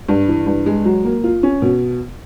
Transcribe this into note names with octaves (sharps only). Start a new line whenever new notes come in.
G2
E3
G2
G#3
F#3
A#3
F4
C#4
B2